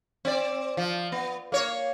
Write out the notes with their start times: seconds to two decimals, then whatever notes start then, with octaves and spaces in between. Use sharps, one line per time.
0.25 C4 D5
0.77 F3
1.12 B3
1.52 A#3 C#5